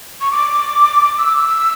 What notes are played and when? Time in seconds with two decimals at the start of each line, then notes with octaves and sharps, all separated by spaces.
0.21 C#6
0.32 D6
1.18 E6